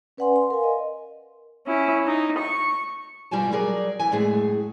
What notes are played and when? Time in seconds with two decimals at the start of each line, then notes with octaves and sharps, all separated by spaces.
0.17 C#4 B4 D5 F#5 G#5 C6
0.36 C6
0.50 A#4 F5 G#5
0.64 D#5
1.66 C#4 E4
2.07 D#4
2.38 C#6
3.31 G2 B2 G3 F4 G#5 A5
3.51 F#3 G3 G#4 A#4 D5
3.99 D#2 E3 G#5
4.12 F#2 A2 G#3 A3 G#4 A4